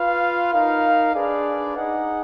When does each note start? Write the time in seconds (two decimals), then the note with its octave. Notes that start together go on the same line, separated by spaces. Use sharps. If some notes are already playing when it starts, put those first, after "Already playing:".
Already playing: F4 B4 F5
0.53 D#4 A#4 F5
1.15 D4 G#4 B4 D5
1.76 D#4 G#4 D#5 F#5